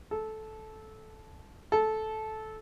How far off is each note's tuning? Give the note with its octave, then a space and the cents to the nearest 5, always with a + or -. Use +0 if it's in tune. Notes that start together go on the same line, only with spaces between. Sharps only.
A4 -15
A4 -15